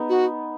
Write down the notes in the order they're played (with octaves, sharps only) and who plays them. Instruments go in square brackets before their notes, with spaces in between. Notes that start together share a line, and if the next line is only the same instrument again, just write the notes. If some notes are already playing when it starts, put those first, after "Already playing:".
Already playing: [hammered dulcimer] B3 D#4
[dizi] F#4